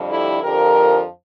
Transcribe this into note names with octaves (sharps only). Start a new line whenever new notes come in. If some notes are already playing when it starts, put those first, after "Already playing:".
Already playing: F2 D3 G3
E4 G4
F2 D3 F3 G4 A#4